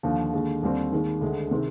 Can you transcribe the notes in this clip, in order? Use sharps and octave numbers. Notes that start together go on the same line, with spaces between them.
D#2 D3 F3
D#2 D3 G#3
D#2 D3 G3 C4
D#2 D#3 G#3
D2 D3 G#3
C3 D#3 G#3 C4